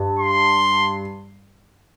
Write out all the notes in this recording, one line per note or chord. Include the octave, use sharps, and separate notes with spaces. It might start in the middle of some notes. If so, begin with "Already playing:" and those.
Already playing: G2
C6